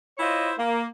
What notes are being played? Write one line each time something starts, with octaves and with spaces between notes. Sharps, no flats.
E4 F4 C5 C#5 D#5
A#3